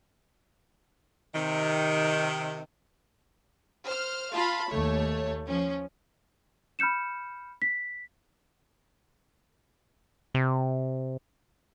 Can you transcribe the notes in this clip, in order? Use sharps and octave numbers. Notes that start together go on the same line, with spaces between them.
C3 D#3
C5 F6
F4 F5 A5 B5
D#2 A3 C#5
F3 C#4
B5 F6 G6 C#7 E7
B6
C3